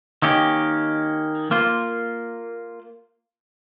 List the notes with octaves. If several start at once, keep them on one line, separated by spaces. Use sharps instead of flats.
D#3 A#3 C#4 G4
A#3 F4 C5